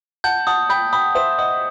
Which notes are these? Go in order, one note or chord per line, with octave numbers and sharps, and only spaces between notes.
F#5 A5 G6
F#5 A5 D#6
G5 B5 G6
G5 B5 D#6
C5 E5 D#6
D#5 F#5 D#6